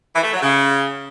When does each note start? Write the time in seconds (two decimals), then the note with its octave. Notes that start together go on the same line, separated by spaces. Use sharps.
0.14 E3
0.23 A3
0.33 F#3
0.42 C#3